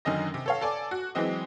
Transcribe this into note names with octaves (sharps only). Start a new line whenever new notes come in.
F#2 D3 D#3 C#4 D#5 A#6
C3
A4 C#5 F5
A4 D5 G#5 D6
F#4
E3 F#3 G#3 C4 D#5